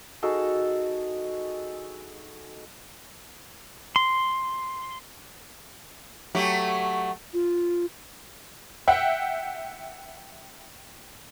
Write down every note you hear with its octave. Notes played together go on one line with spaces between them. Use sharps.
D#4 F#4 G#4 A4
C6
F#3 A3 G4
F4
E5 F#5 G5